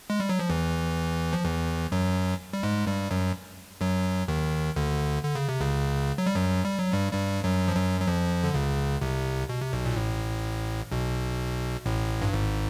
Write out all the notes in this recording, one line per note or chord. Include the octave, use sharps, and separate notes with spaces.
G#3
G3
F#3
F3
E2 E3
F3
E2 E3
F#2 F#3
G3
G#2 G#3
G2 G3
F#2 F#3
F#2 F#3
D#2 D#3
D2 D3
D3
C#3
C3
C#2 C#3
F#3
G3
F#2 F#3
G3
F#3
G2 G3
G2 G3
F#2 F#3
F3
F#2 F#3
F#3
F2 F3
D3
C#2 C#3
C2 C3
B2
C3
B1 B2
A#2
A1 A2
B1 B2
A1 A2
G2
G#1 G#2